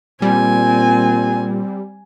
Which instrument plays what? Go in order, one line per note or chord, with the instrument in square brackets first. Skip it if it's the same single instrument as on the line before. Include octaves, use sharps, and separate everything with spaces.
[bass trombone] A#2 [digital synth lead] G3 [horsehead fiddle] C4 [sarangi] G#5